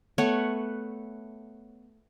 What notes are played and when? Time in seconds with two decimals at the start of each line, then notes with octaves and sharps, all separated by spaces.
0.18 A3 B3 C#5 F#5